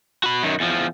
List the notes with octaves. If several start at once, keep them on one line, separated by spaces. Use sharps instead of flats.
F#4 B5
F#2 D#3
E2 F3